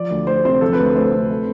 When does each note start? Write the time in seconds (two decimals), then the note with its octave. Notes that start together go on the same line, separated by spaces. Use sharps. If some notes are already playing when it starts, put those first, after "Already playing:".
Already playing: F3 D5
0.11 D2
0.27 A3 C5
0.45 C3 C5
0.61 F3 A4
0.73 B4
0.79 D2
0.84 C5
0.96 A3 C5
1.13 C3
1.31 A3